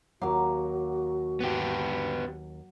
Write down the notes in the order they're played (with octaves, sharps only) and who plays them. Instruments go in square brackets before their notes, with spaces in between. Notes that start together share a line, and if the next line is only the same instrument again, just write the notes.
[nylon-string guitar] D#2 F5 [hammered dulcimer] F#3 D6 [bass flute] F#4
[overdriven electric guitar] B3 G4